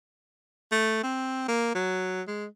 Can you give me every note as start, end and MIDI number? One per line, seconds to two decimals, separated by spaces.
0.72 0.98 57
1.03 1.48 60
1.48 1.72 58
1.74 2.22 54
2.27 2.46 56